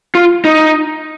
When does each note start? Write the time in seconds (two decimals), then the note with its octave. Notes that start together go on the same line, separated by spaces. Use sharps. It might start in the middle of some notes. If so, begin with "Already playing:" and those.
0.15 F4
0.45 D#4